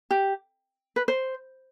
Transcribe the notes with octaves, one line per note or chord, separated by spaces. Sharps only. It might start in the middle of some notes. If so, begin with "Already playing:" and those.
G4
B4
C5